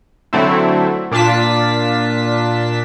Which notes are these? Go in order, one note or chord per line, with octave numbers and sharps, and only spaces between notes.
D3 F#3 A3 C4 E4
A#2 D4 F4 A5 B6